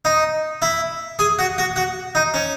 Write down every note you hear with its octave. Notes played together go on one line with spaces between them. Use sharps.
D#4
E4
G#4
F#4
F#4
F#4
D#4
C#4